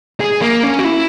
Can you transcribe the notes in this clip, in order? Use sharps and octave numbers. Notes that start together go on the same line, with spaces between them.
G#4
A#3
C#4
F#4
E4